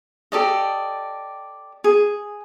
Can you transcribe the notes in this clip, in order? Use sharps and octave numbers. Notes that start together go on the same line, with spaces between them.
G4 A4 D5 D#5
G#4